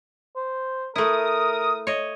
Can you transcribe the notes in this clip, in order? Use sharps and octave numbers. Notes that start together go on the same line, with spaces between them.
C5
A3 E4 A#4 D#6
C#5 D#5